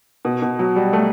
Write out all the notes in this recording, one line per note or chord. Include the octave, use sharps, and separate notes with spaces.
B2
B2
F#3
G3
A3